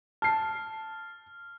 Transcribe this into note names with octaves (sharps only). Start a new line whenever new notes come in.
A5 F6 C7